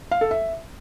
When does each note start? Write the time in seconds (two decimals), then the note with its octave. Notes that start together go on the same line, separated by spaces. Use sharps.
0.11 F5
0.21 A4
0.31 E5